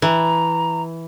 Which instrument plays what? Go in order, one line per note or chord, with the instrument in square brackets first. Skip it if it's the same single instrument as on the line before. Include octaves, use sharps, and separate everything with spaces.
[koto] E3 [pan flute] A#5